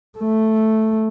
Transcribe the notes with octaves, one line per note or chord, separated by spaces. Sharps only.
A3